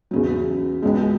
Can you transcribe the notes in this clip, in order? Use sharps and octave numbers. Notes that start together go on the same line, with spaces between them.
E2 C#3 F#3
C#2 B2 G#3